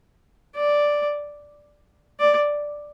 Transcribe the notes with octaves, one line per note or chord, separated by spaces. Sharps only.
D5
D5